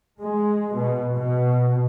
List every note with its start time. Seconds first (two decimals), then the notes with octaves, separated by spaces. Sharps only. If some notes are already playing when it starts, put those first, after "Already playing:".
0.21 G#3
0.76 B2
1.17 B2